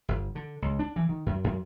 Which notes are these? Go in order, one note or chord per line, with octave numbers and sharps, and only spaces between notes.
G1
D3
C#2
D4
E3
D#3
F#2
F#2